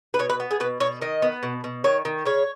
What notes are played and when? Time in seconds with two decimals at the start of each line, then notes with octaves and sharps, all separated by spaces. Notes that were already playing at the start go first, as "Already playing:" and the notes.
0.14 B4
0.19 B2 C#5
0.30 B4
0.40 B3
0.51 G#4
0.60 B2 B4
0.80 B2 C#5
1.01 D#3 D#5
1.22 B3
1.43 B2
1.64 B2
1.84 D#3 C#5
2.05 D#3
2.25 C#3 C#5